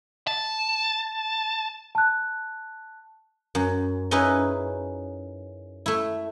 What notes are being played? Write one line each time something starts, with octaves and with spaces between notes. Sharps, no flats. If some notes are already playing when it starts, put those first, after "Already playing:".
A5
A5 F#6
F#2
C#4 D#4 E4 G#4 B4
A3 E4